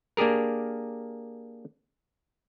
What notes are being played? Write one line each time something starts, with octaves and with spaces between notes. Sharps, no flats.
A#3 D4 G4 G#4 A#4